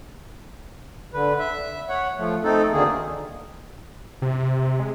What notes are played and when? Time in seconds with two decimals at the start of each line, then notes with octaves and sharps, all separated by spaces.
1.14 D3 B4
1.39 E5
1.89 C#5 F#5
2.18 F3 A3
2.44 A3 C4 D#4 A4
2.72 D2 D3 D#3 A#3 G#4
4.22 C3
4.79 G#3